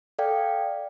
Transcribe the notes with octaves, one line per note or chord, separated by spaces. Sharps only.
A4 D5 F5 G5